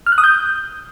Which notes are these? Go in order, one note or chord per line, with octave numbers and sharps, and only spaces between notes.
F6
F#6
D#6
G6